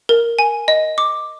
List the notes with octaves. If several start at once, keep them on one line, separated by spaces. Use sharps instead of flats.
A#4
G#5
D#5
D6